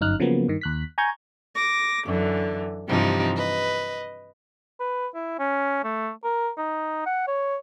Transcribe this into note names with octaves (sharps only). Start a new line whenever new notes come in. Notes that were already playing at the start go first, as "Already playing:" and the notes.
G1 F#2 D#4 F6 F#6
C#3 F3 F#3 A#3 B3
G2 D#3
D#2 F#6 B6
G#5 A#5 C#6 G6 G#6
D6 A#6
F#2 D3 E3
G2 C3 E3 F3 D#4 G4
B4 D#5
B4
E4
C#4
A3
A#4
D#4
F#5
C#5